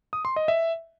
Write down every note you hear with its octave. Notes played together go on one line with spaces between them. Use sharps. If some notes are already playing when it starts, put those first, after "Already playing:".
D#6
C6
D#5
E5